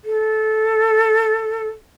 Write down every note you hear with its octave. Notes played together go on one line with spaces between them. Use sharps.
A4